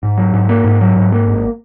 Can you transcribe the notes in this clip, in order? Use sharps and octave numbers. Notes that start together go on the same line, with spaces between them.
G#2
F#3
G#2
A#3
G#2
F#3
G#2
A#3
G#1